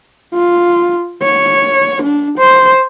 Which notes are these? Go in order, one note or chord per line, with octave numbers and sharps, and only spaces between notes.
F4
C#5
D4
C5